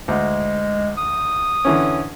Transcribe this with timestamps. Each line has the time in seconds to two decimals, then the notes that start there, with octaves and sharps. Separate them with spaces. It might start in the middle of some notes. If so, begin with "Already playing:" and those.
0.08 D2 G#3
0.98 D#6
1.65 D3 E3 C#4